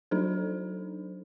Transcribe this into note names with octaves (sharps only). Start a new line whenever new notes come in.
F#3 D4 D#4 A4 C5